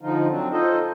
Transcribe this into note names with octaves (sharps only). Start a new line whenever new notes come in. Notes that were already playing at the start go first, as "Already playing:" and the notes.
D3 F3 D#4 F4
F#3 C4 D4
D#4 F4 A4 C5 D#5